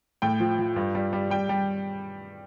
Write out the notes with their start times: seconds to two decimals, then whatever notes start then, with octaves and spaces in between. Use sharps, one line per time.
0.22 A2 G5
0.40 F3
0.58 F3
0.76 G2
0.95 G3
1.13 G3
1.30 G3 G5
1.49 G3